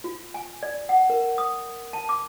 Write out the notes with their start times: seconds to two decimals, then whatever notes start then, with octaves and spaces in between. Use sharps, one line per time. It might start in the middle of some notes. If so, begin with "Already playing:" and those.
0.04 F4
0.34 G#5
0.63 D5
0.89 F#5
1.10 A#4
1.38 D#6
1.93 A5
2.09 D6